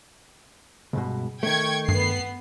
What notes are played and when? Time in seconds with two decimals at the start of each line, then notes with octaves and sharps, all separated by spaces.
0.93 C#2 G2 B2
1.43 D#3 A3 G5 C#6 G#6
1.88 G2 B3 C7